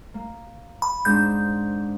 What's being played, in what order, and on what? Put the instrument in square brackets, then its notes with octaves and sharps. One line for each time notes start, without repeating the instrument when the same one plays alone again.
[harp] A#3
[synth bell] B5
[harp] G#2 C4 D4 [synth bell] G6